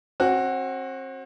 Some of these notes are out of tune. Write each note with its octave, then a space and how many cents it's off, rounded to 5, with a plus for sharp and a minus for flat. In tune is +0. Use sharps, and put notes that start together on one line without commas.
C4 +35 F#4 +0